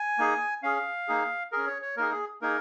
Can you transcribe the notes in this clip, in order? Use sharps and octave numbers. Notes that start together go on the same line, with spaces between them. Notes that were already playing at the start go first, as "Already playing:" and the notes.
Already playing: G#5
A#3 D#4 G#4
C#4 G#4 F5
A#3 D#4 G#4
C#4 G#4 A#4
C#5
C#5
A#3 D#4 G#4 A#4
G#4
A#3 D#4 G#4 A#4